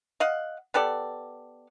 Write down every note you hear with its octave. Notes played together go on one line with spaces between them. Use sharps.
D#5 F5 F#5
B3 G4 A4 D5